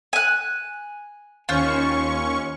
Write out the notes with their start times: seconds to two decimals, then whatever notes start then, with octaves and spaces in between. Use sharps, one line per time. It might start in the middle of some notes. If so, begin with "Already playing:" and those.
0.13 G#5 F#6
1.49 D#2 C#4 F4 C5 C#6